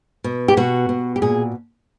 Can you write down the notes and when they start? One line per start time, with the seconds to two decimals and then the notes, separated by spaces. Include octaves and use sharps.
0.24 B2
0.48 G4
0.57 B2 F#4
0.89 B2
1.16 G4
1.22 A#2 G#4